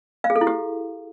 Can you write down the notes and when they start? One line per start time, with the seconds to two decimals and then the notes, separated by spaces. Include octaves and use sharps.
0.24 F5
0.30 G#4
0.36 A4
0.41 E4
0.47 G4